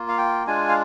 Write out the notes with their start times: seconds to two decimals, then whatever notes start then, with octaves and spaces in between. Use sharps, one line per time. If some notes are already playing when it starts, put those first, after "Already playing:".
Already playing: A#3 F4
0.08 F5
0.18 G5
0.47 G#3 D4 F4 G#5
0.69 F5